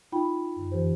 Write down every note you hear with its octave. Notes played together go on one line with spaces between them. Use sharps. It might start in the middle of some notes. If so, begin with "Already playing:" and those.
D#4 F4 G5 B5
F#2 D3
F2 E3 G4 C5